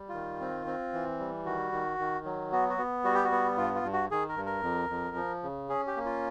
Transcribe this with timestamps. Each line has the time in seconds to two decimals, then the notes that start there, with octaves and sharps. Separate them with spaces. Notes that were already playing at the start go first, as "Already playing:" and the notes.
Already playing: G3
0.09 D#3 F4
0.41 C4
0.66 C4
0.93 E3
1.20 G3
1.45 D#3 F#4
1.72 D#3
1.99 D#3
2.25 F#3
2.52 B3 F#4
2.70 F#4
2.78 B3
3.04 G3 F#4
3.14 G4
3.24 F#4
3.31 B3
3.57 G2 F4
3.75 F4
3.84 G2
3.93 F#4
4.11 D#3 G#4
4.29 A#4
4.37 G2
4.46 A#4
4.63 F2
4.89 F2
5.16 F3
5.43 C#3
5.69 C#4 G#4
5.87 G4
5.96 A#3
6.05 F4